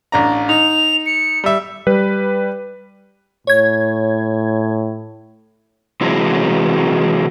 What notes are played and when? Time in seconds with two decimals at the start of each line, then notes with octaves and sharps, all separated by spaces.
0.12 A1 D4 A#5
0.49 D#4 F7
1.06 C#7
1.44 G3 E5
1.87 G3 B4
3.47 A2 C#5 G#6
6.01 C3 E3 F#3 G#3